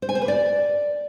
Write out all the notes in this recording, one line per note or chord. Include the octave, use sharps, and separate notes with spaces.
C5
G#5
C5
B4
D5